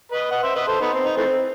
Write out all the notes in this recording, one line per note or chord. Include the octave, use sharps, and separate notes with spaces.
B4 D#5
D#5 F#5
C5 E5
B4 D#5
A4 C5
B3 D#4
C4
D#4
E3 A3 C4